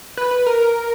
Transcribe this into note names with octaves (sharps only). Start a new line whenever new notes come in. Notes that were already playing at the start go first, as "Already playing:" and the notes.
B4
B4
A#4